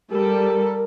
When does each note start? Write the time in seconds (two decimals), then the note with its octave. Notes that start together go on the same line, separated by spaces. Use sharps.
0.12 G3 A4 A#4